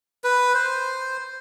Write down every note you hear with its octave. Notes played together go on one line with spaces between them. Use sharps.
B4
C5